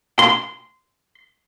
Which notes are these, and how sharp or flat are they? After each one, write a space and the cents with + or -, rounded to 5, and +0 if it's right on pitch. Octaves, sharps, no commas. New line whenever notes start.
C6 -15